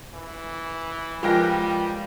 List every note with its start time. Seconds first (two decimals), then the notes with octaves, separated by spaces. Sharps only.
0.14 E3
1.23 F3 G3 G#3 A#4 B4 G5 A#6